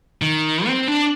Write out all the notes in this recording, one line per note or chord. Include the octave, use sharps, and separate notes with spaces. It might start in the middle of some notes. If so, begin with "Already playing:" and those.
D#3
C4
D4